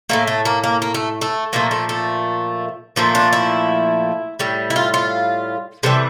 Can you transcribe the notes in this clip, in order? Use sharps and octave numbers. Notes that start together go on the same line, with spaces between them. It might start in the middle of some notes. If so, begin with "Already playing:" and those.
A2 F3 A3 A#3
A3
A#3
A#3
A#3
A3
A3
A#2 F3 A3 A#3
A3
A3
A#2 F3 A3 A#3
D4
E4
A2 G3
E4
F4
F4
C3 E3 G3 A4